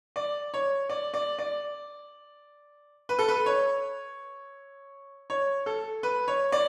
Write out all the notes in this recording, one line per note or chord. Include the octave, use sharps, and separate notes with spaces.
D5
C#5
D5
D5
D5
B4
A4
B4
C#5
C#5
A4
B4
C#5
D5